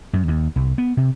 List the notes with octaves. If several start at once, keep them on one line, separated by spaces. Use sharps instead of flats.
F#2
D#2
C2
B3
C3